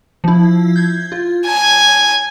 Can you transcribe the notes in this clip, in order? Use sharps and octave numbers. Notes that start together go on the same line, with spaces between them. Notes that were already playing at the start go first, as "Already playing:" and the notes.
F3 E4
G6 G#6
F4
G#5 A5 G#6